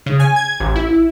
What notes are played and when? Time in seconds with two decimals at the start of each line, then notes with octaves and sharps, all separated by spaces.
0.06 C#3
0.20 G#5
0.36 G#6
0.60 A1
0.76 E4